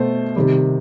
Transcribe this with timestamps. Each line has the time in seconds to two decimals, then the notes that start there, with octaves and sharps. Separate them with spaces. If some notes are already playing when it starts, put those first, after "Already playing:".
Already playing: B2 A3 C5
0.36 C3 D#3 G3